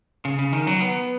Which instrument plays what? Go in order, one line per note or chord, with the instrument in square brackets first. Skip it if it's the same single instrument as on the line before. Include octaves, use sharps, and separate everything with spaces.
[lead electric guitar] C#3
C#3
D#3
F#3
B3